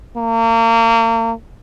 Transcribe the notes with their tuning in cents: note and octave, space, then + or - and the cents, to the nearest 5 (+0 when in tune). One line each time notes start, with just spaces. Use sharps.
A#3 -35